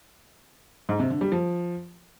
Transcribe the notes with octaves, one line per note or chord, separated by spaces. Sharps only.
G#2
C3
D3
G3
F3